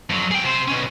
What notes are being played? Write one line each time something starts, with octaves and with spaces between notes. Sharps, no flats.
F2 F#3
G#4 G5
C3 C5
B2 C#4